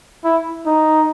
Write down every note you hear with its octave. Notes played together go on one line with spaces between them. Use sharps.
E4
D#4